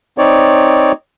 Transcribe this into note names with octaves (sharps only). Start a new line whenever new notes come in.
C4 D#4 C#5 D5